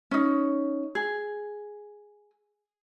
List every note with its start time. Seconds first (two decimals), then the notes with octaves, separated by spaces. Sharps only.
0.11 C#4 D#4
0.95 G#4